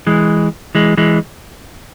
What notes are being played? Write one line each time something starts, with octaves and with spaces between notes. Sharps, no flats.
E3 G#3
E3 G#3
E3 G#3